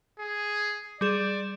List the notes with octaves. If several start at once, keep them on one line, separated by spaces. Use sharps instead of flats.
G#4
G3 G#4 D5 E7